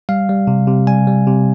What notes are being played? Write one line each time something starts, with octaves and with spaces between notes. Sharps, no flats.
G3 F5
G3
C3
C3
G3 G#5
G3
C3